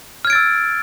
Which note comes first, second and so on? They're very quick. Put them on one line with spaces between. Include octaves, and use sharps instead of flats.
F6 G#6 D7 A6 E6